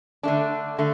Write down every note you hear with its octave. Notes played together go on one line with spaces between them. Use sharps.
D3 A3 D4
D3 A3